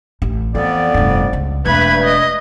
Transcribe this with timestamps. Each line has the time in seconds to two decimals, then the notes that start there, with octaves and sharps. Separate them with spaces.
0.22 A1
0.55 F2 E3 B3 D5
0.94 F1 G2
1.33 C#2
1.66 E1 G2 A3 B4 B5 G#6
2.04 D#5